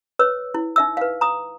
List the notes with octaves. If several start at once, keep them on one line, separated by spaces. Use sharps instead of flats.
B4 C#5 E6
E4
D#4 E5 E6
B4 F5
A#5 D#6